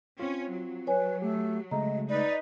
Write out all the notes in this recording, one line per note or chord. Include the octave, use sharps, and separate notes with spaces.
C4 C#4 F4
F#3
B4 C#5 G#5
A3 G4
C#3 G#3 A3 D#5 A#5
D#4 B4 D5